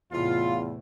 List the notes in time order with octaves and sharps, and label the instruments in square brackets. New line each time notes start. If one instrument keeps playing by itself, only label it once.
[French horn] E2 [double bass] A2 C3 [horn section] F4